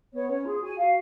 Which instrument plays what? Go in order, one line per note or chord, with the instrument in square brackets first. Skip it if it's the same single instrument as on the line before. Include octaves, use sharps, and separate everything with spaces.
[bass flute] B3 [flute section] C#5
[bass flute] C#4 [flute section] C#5
[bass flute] F4 [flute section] G#4
[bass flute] F#4 [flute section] G#5
[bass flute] F#4 [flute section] F5